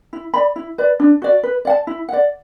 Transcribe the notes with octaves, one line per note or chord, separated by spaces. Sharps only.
E4
D5 B5
E4
B4 D5
D4
F#4 D5
B4
D5 F#5 A5
E4
D5 F#5